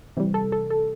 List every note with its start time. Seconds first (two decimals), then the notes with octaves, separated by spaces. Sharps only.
0.17 C3 E3 G3
0.34 A4
0.52 A4
0.70 A4